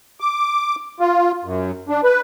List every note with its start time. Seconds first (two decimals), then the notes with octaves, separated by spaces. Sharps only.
0.20 D6
1.00 F4
1.45 F#2
1.89 D4
2.04 B4